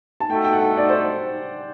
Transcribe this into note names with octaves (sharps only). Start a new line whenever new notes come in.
A5
A3 D#4 F#4 A4 G5
G5
F#5
D5
C5